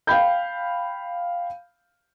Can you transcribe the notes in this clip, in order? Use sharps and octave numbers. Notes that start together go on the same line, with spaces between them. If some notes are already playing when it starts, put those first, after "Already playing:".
F5 G5 B5 G6